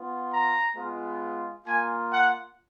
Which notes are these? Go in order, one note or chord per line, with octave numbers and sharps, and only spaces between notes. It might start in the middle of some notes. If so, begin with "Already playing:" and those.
Already playing: B3 F4
A#5
G#3 B3 F4
A#3 F4 G#5
F#5